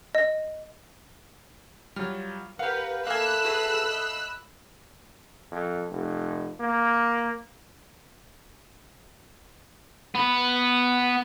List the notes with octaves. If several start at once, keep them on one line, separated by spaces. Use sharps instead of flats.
D#5
F#3 G3 F4
G4 A#4 B4 F5 F#5
A#3 A4 E5 F5 G#5 B5 E6 F#6
F#4 G#4 B4
D#5
F2
F1
A#3
B3 B4